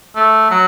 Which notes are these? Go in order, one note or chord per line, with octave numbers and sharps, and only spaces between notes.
A3
F#3